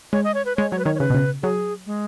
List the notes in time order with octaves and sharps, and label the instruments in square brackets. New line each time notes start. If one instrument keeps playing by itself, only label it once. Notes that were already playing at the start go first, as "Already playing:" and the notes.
[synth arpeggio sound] G#3 [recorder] C#5
[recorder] D#5
C#5
B4
[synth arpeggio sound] G#3 [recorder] C#5
[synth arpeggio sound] F#3 [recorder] C#5
[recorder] B4
[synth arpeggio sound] D#3 [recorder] C#5
[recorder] C#5
[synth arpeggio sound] C#3 [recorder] B4
[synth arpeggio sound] B2
C#3
[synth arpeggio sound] F#3 [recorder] G#4
[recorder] G#3